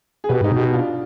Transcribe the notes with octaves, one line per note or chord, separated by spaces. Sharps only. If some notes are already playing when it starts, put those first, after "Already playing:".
G#4
B2 G4 B4
G#2 D#4 G4
B2
D#4 G4
D4 F4